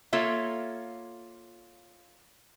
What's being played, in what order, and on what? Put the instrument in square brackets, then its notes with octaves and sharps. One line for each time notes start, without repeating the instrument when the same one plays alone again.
[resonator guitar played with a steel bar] A#3 F4 A4 C#5 E5